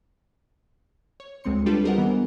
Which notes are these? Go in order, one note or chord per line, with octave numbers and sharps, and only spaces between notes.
C#5
D2 G#3 C4 C6 C#7
G3 D4 F4 G4 A4 B4
G#4 A#4 C5 D#5 F#5
E3 B3